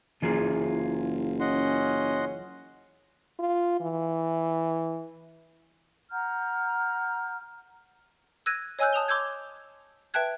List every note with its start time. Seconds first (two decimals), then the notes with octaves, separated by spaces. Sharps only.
0.22 F#1 E3 F4 G#4
1.40 C#4 D#5 F#5 C6
3.40 F4
3.81 E3
6.11 F#5 A#5 F6 G6
8.46 E6 F#6 G#6 A#6 D#7
8.79 C#5 D#5 G#5 E6 F#6 G6
8.93 A5 D#6 F7 G7
9.08 C6 D6 E6 G6 G#6
10.14 B4 E5 G5 A5 F#6 G#6